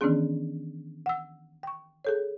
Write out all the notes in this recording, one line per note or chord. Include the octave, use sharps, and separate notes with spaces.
D#3 E3 B3 C#4 D4 G#4
F#5 E6
G5 C#6
G#4 A4 C#5